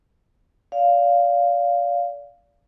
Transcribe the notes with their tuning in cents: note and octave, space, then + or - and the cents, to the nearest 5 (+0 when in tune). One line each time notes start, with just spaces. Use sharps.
D5 -35 F5 +0